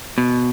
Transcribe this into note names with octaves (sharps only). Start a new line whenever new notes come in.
B2